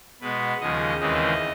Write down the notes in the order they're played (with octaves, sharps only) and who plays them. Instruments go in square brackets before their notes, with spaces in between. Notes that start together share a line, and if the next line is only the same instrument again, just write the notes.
[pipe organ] B2 G#3 B3 B4
D#2 C#3 F3 G#3 D#5
D#2 C#3 E3 G#3 C4 D#5